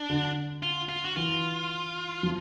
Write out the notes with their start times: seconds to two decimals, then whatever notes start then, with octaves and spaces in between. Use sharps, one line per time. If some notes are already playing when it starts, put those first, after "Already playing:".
Already playing: D4
0.10 D3
0.63 F4
0.89 F4
1.05 F#4
1.16 E3 F4
2.23 F3